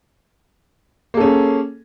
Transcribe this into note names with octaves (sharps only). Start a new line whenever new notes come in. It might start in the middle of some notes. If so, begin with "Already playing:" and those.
A#3 C#4 G#4 A4